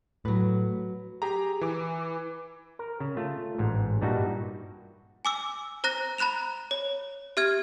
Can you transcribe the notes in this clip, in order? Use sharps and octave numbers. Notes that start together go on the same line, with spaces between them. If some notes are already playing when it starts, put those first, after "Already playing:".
A2 F#3 B4
G4 G#4 A#5
E3 D6
A#4
C#3
A3 F4
A1 G#2
G2 A#2 G3 D#4 E4 F#4
G#5 D6 E6
C5 A#5 F#6 A#6
A#5 B5 F#6 E7 F7
C#5
G4 E5 F6 G#6